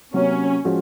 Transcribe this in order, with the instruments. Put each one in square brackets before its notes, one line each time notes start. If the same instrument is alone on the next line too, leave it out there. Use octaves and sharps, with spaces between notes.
[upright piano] C3 F#3 A#3 [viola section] C#4
[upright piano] F3 G#3 C#4 F#4